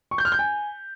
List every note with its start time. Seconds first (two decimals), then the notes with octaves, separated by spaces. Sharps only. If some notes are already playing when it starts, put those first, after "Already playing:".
0.11 C#6
0.18 G6
0.25 F6
0.32 G6
0.39 G#5